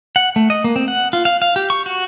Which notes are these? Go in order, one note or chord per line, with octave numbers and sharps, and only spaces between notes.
F#5
A3
D#5
A#3
C4
F#5
F4
F5
F5
G4
C#6
F#4